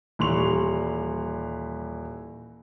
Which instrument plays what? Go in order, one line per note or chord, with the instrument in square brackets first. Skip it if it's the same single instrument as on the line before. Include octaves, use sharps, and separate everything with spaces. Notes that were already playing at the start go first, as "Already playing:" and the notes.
[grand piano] D#1 E3 G3 C6 C#6 F7